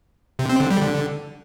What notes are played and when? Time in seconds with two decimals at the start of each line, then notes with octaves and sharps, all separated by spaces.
0.39 C3
0.50 C4
0.60 D3
0.71 G3
0.81 D3